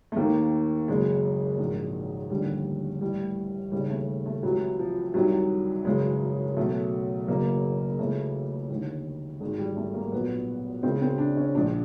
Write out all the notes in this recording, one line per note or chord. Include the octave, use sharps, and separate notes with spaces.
A3
D#2 D#3 A#3
F#1 F#2 C#3 G#3
A#1 G#2 D#3
F1 D#2 D3 G3
A1 A2 E3 G3
D#2 C#3 E3 G3
A3
A3
C#2 C3 E3 F#3
F3
C2 C3 D#3 F#3
G#1 F#2 C#3 E3 G#3
B1 B2 A3
F#1 F#2 C#3 E3 A#3
C#2 C#3 E3 A3
D#2 D3
G#1 G#2 D#3 G#3
G3
A3
A#3
B1 A#2 B3
C#2 C#3 E3 C4
C4
D4
C#4
A#1 A#2 D4